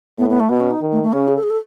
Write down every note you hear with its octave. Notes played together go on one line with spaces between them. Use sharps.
A2 B3
B3
A3
B2 B3
C#4
D#4
D#3
A3
A3
C#3 C#4
G#4
A4
G#4
A4